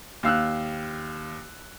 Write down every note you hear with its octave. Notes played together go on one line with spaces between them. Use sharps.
D#2 F5 E6 F#6